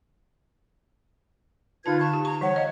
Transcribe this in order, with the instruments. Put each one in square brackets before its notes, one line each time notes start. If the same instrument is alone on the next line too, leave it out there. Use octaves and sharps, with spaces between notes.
[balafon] D3 D#4 A5 [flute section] F4 B4 G#6
[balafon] D3 F5 [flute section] A5 C#6
[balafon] G4
[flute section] A#5 [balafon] C#6
[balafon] E3 G3 [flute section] C#5 F#5
[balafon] D#5 F5